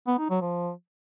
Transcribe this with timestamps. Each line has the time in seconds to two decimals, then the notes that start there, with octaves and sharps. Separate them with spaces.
0.07 B3
0.19 D#4
0.30 F#3
0.41 F3